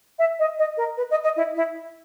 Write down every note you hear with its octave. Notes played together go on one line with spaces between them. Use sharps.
E5
D#5
D#5
A#4
B4
D#5
D#5
E4
E4